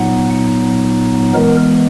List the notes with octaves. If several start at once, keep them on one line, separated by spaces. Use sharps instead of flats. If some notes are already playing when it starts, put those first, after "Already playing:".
Already playing: A#2 F#3 B3 D#4 F#5
E3 G#3 B3 A#4